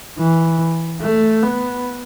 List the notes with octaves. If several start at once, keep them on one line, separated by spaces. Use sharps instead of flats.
E3
A3
B3